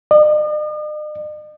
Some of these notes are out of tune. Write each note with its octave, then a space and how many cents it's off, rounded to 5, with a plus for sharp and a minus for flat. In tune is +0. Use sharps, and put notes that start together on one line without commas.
D#5 -45